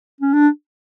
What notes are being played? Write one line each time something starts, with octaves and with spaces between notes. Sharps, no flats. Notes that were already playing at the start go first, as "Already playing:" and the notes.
C#4
D4